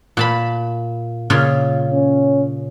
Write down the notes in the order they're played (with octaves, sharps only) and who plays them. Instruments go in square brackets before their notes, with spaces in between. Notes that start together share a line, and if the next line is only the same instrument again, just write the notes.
[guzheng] A#2 A5 B5
A#2 C#3 F4
[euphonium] C#4